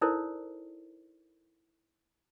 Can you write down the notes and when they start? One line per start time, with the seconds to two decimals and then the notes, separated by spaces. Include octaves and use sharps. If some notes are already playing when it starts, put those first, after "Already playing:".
0.01 D#4 E4 A4 A#4 C5 D5